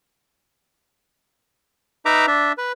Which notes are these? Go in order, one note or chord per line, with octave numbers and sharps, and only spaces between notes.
D#4 B4 E5 A#5 D6
D4 E5
B4